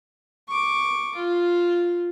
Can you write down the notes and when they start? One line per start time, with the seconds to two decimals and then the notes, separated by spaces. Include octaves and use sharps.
0.48 C#6 D6
1.15 F4